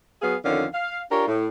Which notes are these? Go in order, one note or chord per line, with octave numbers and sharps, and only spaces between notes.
F#3 B3 G#4 F5
F2 D3 D#3 C#4 F5
F5
D4 F4 G4 A#4 C#5
A2